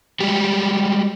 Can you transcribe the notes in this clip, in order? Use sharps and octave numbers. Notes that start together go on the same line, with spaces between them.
G3 G#3 F#4 G4